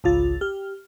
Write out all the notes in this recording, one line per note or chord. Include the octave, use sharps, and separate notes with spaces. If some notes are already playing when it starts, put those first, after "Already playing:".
G#1 C#2 F4 A6
G4 F6